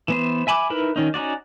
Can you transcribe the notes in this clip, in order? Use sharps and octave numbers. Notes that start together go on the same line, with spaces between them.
E3 B3 C5
E5 G#5 B5 C#6 D6
D#4 E4 A#4 B4
D#3 C#4 D#4
C#4 D#4 F#4 D5